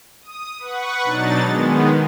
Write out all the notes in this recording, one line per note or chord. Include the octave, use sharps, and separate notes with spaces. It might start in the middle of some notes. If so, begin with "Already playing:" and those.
D#6
B4 F#5 C#6
B2 F#3 D4 D#4 A6
D#3 G#3 B3